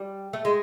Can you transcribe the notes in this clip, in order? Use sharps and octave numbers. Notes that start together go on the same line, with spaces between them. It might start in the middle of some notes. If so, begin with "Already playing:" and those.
Already playing: G3
A3
G#3